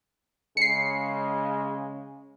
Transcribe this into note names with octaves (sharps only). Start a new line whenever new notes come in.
C#3 G#3 C7 C#7